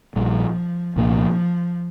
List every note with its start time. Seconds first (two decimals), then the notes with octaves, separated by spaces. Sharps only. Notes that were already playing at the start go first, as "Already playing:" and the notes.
0.16 A#1 A#2 F3 G3
0.96 C2 A#2 F3 A#3 D4